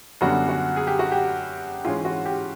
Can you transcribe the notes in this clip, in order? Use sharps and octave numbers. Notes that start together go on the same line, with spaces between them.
F#2 D3 G3 B3 F#4
F#4
G#4
G4
F#4
G4
G#2 E3 G#3 C#4 F4
F#4
G4